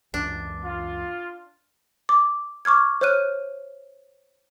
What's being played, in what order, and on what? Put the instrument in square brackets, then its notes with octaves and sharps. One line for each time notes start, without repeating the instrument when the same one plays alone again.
[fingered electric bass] C#2 F#2 E3 [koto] D4
[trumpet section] F4
[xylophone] D6
C#6 D6 F6 G#6
C5 C#5 F6 F#6 D#7